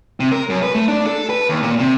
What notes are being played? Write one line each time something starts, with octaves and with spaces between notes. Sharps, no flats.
C3
A#4
F#2
B4
A3
D4
A4
B4
D#2
A#2
C3